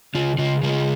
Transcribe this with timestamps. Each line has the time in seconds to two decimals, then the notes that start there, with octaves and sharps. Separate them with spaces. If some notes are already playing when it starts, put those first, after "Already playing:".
0.15 C#3 F4
0.38 C#3 F4
0.63 C#3 F4 G#4